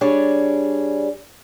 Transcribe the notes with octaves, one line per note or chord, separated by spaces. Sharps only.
G3 D4 G#4 C#5